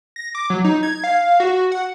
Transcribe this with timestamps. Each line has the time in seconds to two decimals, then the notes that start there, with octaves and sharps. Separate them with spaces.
0.16 A#6
0.35 D6
0.50 F#3
0.64 D#4
0.83 G#6
1.04 F5
1.40 F#4
1.72 F#5